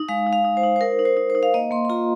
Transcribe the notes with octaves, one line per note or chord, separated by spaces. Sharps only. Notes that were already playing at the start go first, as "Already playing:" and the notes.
Already playing: D#4
G#3 F5
D#4
F5
D#4
C5
D#4
C5
D#4 A#4
D#4
C5
D#4
C5
D#4
F5
A#3 D#5
A#3 C6
C6
F4 A#5